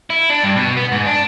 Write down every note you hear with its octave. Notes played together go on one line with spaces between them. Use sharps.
E4
D4
G2
B2
B3
G#2
D4